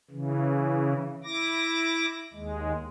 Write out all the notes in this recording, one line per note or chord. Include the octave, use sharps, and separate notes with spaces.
C#3 E3
E4 D6 A#6
D#2 G#3